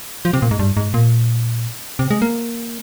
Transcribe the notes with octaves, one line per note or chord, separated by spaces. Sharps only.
F3
C3
A#2
G#2
G2
G#2
A#2
C3
G#3
A#3